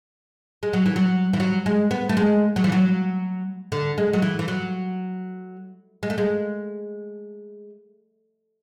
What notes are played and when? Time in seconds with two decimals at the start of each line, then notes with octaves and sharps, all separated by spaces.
0.63 G#3
0.73 F#3
0.86 E3
0.96 F#3
1.33 E3
1.40 F#3
1.66 G#3
1.91 B3
2.09 A3
2.17 G#3
2.56 F#3
2.64 E3
2.72 F#3
3.72 D3
3.98 G#3
4.13 F#3
4.22 E3
4.39 E3
4.48 F#3
6.03 G#3
6.10 A3
6.18 G#3